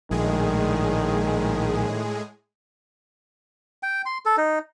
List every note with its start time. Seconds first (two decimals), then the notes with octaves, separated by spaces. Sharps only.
0.11 A#1 A2 D#3 G#3 G#4
3.83 G5
4.06 C6
4.25 A4
4.37 D#4